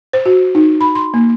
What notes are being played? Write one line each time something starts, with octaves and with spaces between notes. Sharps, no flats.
C5
F#4
D#4
B5
C6
A#3